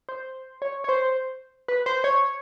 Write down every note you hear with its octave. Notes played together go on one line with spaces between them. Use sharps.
C5
C#5
C#5
C5
B4
C5
C#5